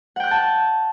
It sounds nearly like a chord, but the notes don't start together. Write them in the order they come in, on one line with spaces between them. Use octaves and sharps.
F#5 G5 F#6 G6 A5